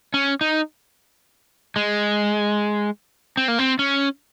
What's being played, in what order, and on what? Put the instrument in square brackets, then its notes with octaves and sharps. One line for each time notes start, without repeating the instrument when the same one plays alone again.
[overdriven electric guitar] C#4
D#4
G#3
C4
A#3
C4
C#4